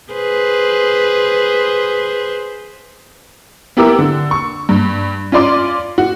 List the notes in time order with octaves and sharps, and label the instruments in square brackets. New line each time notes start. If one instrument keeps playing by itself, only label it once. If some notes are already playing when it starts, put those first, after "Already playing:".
[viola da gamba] G#4 B4 C5
[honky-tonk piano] B3 E4 G4 A#4 D6 E6
D3
C#6
G2
C#4 F4 D5 C6 D6
F#4